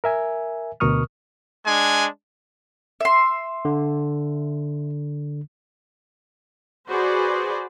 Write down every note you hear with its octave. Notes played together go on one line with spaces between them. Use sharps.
A#4 E5 G#5
D2 B2 A#4 C#6 D#6 F6
G#3 D4 G#5
E5 C6
D3
F#4 G#4 B4 C5 D5